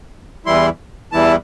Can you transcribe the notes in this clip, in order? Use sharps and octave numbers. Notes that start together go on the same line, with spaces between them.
E2 E3 G3 E4 C6
E2 E3 G3 E4 A5